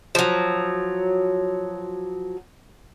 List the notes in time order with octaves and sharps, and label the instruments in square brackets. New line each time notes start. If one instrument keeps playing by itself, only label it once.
[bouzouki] F3 F#3